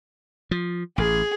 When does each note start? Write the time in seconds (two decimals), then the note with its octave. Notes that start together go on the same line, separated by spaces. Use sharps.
0.51 F3
0.98 A1 G#4